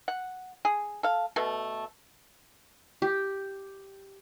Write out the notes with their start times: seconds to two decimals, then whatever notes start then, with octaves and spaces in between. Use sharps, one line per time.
0.08 F#5
0.65 G#4
1.03 A4 F5
1.36 B2 A3 A4
3.02 G4